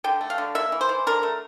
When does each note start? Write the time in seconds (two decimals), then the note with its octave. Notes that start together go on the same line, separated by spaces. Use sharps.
0.04 D3 G5
0.21 A3
0.30 F5
0.38 D3
0.55 A#3 E5
0.72 E3
0.81 C5
0.89 E3
1.07 D3 A#4
1.23 A3